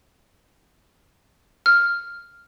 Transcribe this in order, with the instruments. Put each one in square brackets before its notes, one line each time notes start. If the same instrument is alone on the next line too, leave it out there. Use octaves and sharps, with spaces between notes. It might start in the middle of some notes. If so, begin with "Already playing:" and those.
[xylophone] F6